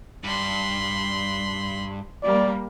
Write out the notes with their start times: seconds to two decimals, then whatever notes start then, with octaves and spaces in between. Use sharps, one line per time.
0.24 G2 B5 C6
2.22 G3 A#3 D5